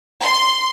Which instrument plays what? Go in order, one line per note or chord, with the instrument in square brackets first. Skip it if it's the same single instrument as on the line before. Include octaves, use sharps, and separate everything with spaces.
[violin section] C6